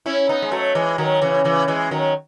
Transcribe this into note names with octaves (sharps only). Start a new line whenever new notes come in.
C#4 E4
B3 D#4
G#3
F#3 A3
E3 G#3
D#3 F#3
C#3 E3
C#3 E3
E3 G#3
D#3 F#3